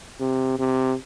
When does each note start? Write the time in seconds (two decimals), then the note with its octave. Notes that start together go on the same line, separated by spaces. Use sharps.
0.20 C3
0.59 C3